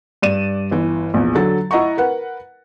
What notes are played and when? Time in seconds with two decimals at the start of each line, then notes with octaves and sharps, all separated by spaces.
0.22 G2 D5 D#7 E7
0.71 G1 E3
1.14 A#1 E2
1.35 D3 F#3 A4 A6
1.71 E4 D#5 F#5 A#5 C#6
1.97 A#4 B4 F#5